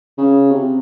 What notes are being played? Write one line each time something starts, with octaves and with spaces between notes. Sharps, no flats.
C#3
C3